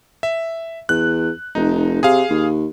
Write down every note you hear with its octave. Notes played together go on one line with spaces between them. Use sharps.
E5
E2 F#6
F1 D#4
C3 G#4 F5
D#2